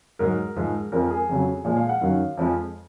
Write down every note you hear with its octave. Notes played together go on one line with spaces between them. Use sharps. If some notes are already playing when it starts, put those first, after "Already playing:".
G#2 F#3 A#4
G#2 F3 G#3
F2 F3 G#3 A#4
G#4
F2 C#3 F#3
A#2 F3 G#3 G#4
F5
F#5
F#2 D#3 F#3 F5
F2 F3 G#3